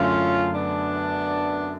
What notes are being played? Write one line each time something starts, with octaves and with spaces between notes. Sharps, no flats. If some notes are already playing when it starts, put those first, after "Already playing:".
Already playing: F#2 D3 F#3 A3 C#4 F4
B3 D4